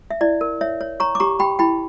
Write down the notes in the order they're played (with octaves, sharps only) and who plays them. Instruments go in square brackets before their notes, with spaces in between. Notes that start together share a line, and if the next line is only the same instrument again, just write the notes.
[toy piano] E5
E4 D5
A#4
C#5 E5
C#5
C#5 A#5 C#6
D6
G4 A#5 C#6
G4 G5 B5
E4 G5 B5